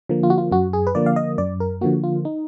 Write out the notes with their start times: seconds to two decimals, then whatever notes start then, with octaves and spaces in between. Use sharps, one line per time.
0.09 D3 F3 A#3
0.23 F4
0.30 F#4
0.38 F4
0.52 F#2 F#4
0.73 G#4
0.87 B4
0.95 D3 F3 A#3 D5
1.06 F5
1.16 D#5
1.38 F#2 D5
1.60 A#4
1.81 D3 F3 A#3 F#4
2.04 F4
2.25 D#4